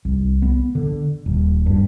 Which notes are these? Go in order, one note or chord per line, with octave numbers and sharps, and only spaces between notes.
C2
B3
D3
D#1
G2